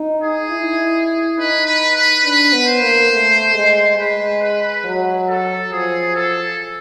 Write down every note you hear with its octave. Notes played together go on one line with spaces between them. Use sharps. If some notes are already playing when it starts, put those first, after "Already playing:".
Already playing: D#4
G#4
E4
D#4 B4
B4
B4
D4 B4
B3
C5
A#3
A3
G#3
G#3 B4
B4
F#3
A4
F3 G#4
A4